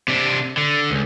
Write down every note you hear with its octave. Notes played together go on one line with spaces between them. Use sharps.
C3 D4
D3
C#2